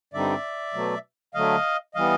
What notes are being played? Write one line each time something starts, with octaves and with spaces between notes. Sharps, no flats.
G2 D3 G3 C4 D#4 D5 E5
B2 F#3 A3
D3 F#3 A3 D#5 F5
E3 G3 B3 D#5 F5